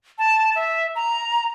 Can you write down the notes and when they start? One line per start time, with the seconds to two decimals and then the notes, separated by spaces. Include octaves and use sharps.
0.19 A5
0.55 E5
0.95 A#5